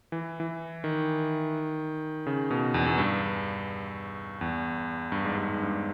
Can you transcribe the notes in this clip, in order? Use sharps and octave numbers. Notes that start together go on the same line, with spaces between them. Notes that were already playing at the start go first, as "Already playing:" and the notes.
E3
E3
D#3
C#3
B2
E2
E2
G2
E2
G2
G#2
G2
G#2
G2